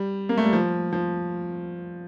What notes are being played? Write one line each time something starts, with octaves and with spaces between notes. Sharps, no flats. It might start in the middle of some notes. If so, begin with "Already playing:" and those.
Already playing: G3
A#3
A3
G3
F3
F3